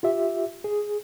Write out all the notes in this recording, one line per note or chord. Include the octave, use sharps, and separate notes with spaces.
F4 G4 E5
G#4